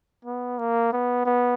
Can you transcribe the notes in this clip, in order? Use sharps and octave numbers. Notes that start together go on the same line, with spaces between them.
B3
A#3
B3
B3